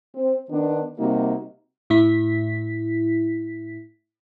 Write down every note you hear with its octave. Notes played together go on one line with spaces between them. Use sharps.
C4
D#3 B3 D4
C3 G3 A#3 D#4 F#4
A2 E4 B6